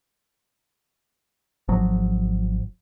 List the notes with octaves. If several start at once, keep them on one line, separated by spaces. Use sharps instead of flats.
G#1 F3 F#3